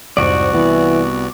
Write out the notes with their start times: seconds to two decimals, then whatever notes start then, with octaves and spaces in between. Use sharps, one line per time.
0.17 C2 F2 G#2 F#4 C5 D5
0.54 E3 B3